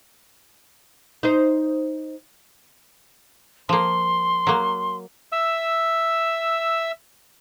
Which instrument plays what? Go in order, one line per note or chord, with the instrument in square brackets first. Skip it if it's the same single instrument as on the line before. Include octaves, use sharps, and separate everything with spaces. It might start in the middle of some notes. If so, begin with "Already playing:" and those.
[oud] D#4 C5
[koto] F3 A#3 [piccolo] C6
[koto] F#3 A#3
[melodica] E5 E6